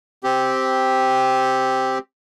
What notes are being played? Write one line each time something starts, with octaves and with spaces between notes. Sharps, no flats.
C4 G4